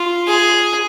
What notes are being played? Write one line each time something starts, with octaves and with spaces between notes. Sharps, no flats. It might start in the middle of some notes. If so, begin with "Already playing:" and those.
Already playing: F4
G#4